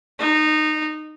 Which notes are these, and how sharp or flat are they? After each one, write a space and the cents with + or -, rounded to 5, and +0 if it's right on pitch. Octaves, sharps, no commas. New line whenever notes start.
D#4 -20